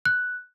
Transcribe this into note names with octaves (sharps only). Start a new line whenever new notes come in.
F#6